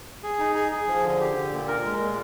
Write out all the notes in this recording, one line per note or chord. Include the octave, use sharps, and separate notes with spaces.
G#4
D#4
G#4
G#4
F3
D3
G4
D3
A#2
A#4
G#3
A#2